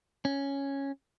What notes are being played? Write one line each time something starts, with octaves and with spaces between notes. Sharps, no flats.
C#4